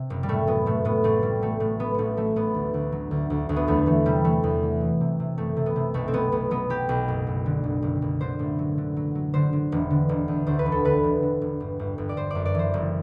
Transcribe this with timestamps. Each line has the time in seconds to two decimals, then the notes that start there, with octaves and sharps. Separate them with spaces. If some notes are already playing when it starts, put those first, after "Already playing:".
Already playing: C3
0.10 F#1
0.23 G3
0.28 A2 A3
0.47 F#3 B3
0.66 A2 A3
0.85 A2 B3
1.04 A1 A3
1.22 F#3 G3
1.42 F#3 A3
1.60 A2 A3
1.79 F#3 B3
1.94 A1 A3 B3
2.17 F#3 A3
2.36 A1 B3
2.54 D2
2.74 D2
2.92 F#3
3.11 D2
3.30 D2
3.49 D2
3.56 B3
3.68 E2 A3
3.86 E3 A3
4.06 C3 G3
4.24 E3 A3
4.44 E2
4.63 E3
4.81 F#3
5.01 C3
5.20 C3
5.38 F#1 A3
5.56 C3
5.66 B3
5.76 C3
5.94 B1 A3
6.08 C4
6.13 F#3 B3
6.32 B1 B3
6.51 F#3 B3
6.70 F#3 G4
6.89 B1
7.08 F#1
7.27 F#1
7.46 D3
7.64 F#1
7.82 F#1
8.02 F#1
8.21 D3 C5
8.39 A1
8.59 F#3
8.78 D3
8.97 F#3
9.15 F#3
9.34 D3 C5
9.53 D3
9.72 E1
9.91 D3
10.09 E1
10.28 E2
10.47 D2 C5
10.59 B4
10.66 E1
10.72 A4
10.85 D3 B4
11.04 E1
11.23 D3
11.42 E1
11.60 G1
11.79 G1
11.98 G1
12.09 D5
12.17 G1 C5
12.31 F#2 D5
12.45 D5
12.54 E3 C5
12.74 F#1